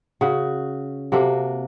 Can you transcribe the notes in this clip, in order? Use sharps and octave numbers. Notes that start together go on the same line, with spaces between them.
C#3 F#4
C3 A#3 F#4 A4